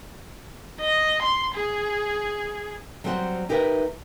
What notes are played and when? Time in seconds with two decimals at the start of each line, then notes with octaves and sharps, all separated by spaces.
0.81 D#5
1.22 C6
1.55 G#4
3.04 F#3 G3 C4 C5 D5 F#5
3.49 D#4 G4 A#4 B4 C#5 E5